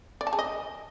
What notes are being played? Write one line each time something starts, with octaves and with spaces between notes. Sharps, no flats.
D5
A5
G#4
D#5